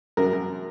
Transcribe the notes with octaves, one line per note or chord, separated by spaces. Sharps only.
F#2 A#4
F#2